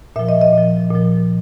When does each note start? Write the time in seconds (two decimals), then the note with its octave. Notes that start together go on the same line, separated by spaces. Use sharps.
0.16 A#2 F3 E5
0.29 D#5
0.41 D#5
0.53 A#2 F3
0.90 A#2 F3